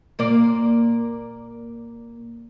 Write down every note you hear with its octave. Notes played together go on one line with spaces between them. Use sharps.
A#2 A#3 D5